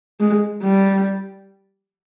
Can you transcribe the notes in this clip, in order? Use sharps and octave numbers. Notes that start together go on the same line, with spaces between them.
G#3
G3